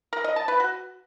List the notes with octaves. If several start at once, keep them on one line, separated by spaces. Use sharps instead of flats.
A#4
D#5
A5
B4
F#4